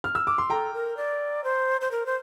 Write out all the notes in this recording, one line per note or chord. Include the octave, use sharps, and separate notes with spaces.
F6
E6
D6
C6
A4 G5 A#5
A#4
D5
C5
C5
A#4
C5